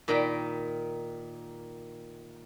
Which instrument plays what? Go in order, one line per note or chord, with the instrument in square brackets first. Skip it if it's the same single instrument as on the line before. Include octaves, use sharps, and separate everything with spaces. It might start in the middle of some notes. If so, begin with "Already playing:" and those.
[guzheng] A#2 D#3 A#4 G5 B5